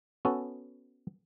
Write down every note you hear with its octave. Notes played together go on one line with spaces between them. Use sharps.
B3 C#4 F#4 A4